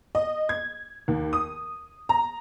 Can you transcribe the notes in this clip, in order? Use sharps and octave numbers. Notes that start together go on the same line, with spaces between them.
D#5
G#6
D#2
D#6
A#5